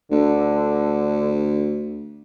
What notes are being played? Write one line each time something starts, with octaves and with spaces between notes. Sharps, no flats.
D2 D3